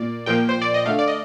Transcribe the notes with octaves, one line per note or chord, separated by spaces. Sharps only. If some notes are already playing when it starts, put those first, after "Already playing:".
Already playing: A#2 A#3 D5
A#2 F3 A#3 G5
C5
D5
D#5
D3 A3 F5
D5
D#5